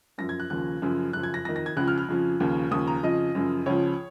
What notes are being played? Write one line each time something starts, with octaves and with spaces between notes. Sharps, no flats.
F#2 F3 A#6
G#6
F#6
D#2 C#3 F3 F#6
F#2 C#3 F3
F#2 C#3 F3 F#6
G#6
A#6
F2 D#3 A#6
A#6
G#6
C#2 C#3 F3 F#6
F6
F6
F2 C#3 F3
D#2 C#3 F3
D#2 C#3 F3 D#6
A#5
F2 C#3 F3 D#5
F#2 C#3 F3
C#2 C#3 F3 C#5